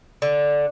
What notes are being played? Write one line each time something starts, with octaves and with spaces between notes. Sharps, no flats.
D3